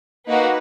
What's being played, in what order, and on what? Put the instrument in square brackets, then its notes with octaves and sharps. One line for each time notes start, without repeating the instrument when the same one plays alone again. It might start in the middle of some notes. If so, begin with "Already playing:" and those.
[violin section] A#3 D#4 F#4 B4